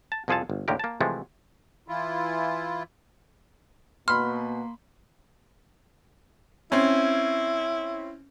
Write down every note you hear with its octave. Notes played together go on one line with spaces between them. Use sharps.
A5
C2 F2 F3 G#4 A4 A5
G1
D#2 A2 D3 G4 A#4
A#3 A5
C3 E3 F3 G#3 A3
E3 E4 F4
B2 A#3 B5 C6 F6
C4 C#4 E4